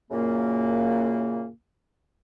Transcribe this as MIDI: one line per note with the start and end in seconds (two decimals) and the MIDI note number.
0.11 1.48 42
0.11 1.48 46
0.11 1.48 49
0.11 1.48 58